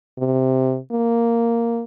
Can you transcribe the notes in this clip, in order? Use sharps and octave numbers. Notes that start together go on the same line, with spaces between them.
C3
A#3